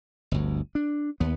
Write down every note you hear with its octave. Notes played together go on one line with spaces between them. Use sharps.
G1 D2
D4
D#2 B3